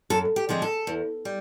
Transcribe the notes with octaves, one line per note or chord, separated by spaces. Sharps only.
F#2 A4
G4
D3 F3 G#3 C4
A4
E2
G3